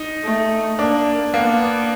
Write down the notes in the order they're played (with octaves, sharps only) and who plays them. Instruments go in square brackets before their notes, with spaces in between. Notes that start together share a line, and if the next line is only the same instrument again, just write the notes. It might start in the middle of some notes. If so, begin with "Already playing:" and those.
Already playing: [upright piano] D#4
[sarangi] A3
[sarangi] A#3 [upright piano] D4
[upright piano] A#3 [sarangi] B3